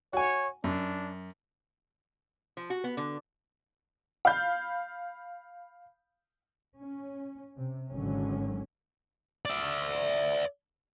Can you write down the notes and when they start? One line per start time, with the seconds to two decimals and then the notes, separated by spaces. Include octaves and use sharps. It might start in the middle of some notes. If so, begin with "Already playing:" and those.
0.13 F#4 C#5 G#5
0.64 F#2 D4
2.57 F3
2.70 F#4
2.84 B3
2.97 D3
4.25 F5 B5 G6
6.78 C#4
7.57 C3
7.91 G#1 D3 F#3 C#4
9.45 D5 E5